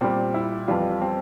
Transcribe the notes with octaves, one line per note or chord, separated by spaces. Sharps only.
A#2 G3 C4
E4
F2 E3 G3 F4
C4